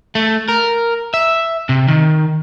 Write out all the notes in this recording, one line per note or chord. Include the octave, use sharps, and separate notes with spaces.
A3
A#4
E5
C3
D#3